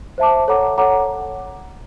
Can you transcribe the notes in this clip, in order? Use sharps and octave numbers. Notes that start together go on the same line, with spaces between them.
C5 E5 A5 D6
A4 C#5 F#5 A#5 D6
A4 C#5 F#5 A#5 D6